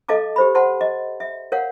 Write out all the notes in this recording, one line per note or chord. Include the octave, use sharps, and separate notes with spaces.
A4 D#5 F5 A5 D6
G4 C5 B5
C5 F#5 A5 C6
D#5
E5
A#4 C#5 F5 F#5